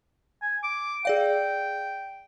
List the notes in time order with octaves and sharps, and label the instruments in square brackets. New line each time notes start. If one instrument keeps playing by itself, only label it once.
[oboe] G#5
D6
[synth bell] G#4 D5 F5 [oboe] G5